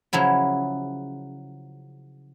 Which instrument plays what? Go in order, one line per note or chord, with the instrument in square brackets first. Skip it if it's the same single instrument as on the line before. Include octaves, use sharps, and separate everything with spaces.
[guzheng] C#3 F3 F#3 E4